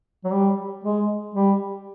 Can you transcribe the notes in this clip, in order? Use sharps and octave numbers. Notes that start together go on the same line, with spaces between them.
F#3
G3
G#3
G3